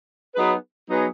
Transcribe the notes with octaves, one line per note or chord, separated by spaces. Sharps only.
F#3 B3 D#4 G#4 B4
F#3 B3 D#4 G#4 B4